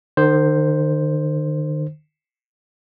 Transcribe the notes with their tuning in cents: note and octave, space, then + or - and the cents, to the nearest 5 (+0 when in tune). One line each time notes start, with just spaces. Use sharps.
D#3 -40 C5 +0